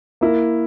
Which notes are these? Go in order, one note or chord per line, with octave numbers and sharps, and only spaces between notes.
A#3 E4 A#4